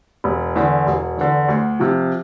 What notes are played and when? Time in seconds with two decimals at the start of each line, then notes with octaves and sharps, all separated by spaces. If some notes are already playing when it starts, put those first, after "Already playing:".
0.24 E1
0.56 E2 D3
0.87 E1
1.17 E2 D3
1.48 D2
1.80 C3 F3